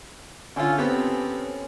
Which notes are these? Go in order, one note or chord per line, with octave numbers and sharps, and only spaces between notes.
D3 C#4 F4 A4
B3 C4 G4